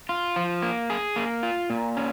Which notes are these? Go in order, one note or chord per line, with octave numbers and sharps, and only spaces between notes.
F4
F3
A#3
G#4
A#3
F4
A#2
C#4